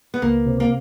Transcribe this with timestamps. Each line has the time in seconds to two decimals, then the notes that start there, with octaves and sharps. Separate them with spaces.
0.14 B3
0.22 C#2 A#3
0.46 C3
0.60 A#3